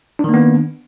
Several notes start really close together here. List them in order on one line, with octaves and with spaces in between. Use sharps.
D4 D#3 A#3 B3